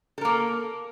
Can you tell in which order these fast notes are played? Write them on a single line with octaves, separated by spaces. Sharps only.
A4 A#4 A#3